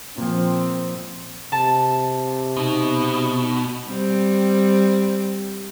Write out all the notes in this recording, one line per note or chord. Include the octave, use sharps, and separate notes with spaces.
A#2 F3 C4
C3 A5
B2 D#4
G3 C4